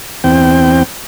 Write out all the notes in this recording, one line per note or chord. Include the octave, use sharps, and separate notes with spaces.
E2 C4 G5